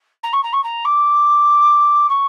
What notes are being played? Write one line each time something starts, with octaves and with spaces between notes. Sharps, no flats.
A#5
C#6
A#5
C#6
A#5
D6
C#6